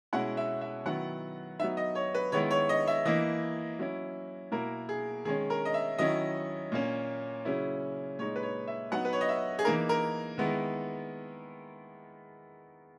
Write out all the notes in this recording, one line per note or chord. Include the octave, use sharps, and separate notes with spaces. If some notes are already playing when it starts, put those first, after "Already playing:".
B2 G#3 C#4 E4 F#5
E5
E5
D#3 F#3 B3 E4 F#5
F#3 B3 D#4 E5
D#5
C#5
B4
D#3 G#3 B3 E4 C#5
C#5
D#5
E5
E3 A#3 E4 D#5
F#3 C#4 E4
B2 A#3 E4 A#4
G#4
D#3 G#3 C#4 G#4
A#4
D#5
E5
D#3 F#3 C#4 E4 D#5
A#2 A#3 C#4
C#3 F#3 C#4 E4
A#2 G#3 D#4 C#5
B4
C#5
E5
F#3 B3 D#4 F#5
B4
C#5
D#5
E5
G#4
E3 A#3 D#4 A#4
A#4
D#3 G#3 B3 E4